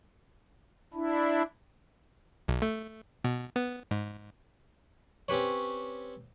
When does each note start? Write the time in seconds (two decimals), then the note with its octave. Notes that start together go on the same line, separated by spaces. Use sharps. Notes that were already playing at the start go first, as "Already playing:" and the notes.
0.94 D4 E4
2.48 B1
2.62 A3
3.24 B2
3.56 B3
3.91 G#2
5.29 C4 C#4 G4 B4 C#5